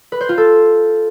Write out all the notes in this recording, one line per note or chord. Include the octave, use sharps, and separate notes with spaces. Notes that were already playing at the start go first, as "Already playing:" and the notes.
B4
C5
F4
A4